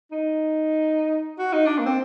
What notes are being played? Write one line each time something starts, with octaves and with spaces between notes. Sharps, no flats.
D#4
F#4
D#4
D4
A#3
C4